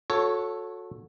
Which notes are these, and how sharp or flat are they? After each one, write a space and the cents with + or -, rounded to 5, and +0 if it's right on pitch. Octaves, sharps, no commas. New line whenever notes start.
F#4 -30 A4 +0 C#5 +0